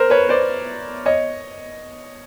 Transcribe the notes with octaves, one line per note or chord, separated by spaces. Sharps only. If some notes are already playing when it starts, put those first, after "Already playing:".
Already playing: A#4 C5
B4 C#5
C5 D5
C#5 D#5